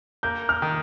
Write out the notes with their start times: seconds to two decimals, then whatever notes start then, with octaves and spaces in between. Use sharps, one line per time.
0.23 A#3 G6
0.49 F6
0.62 D#3